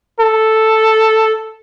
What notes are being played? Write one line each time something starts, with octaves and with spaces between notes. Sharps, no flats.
A4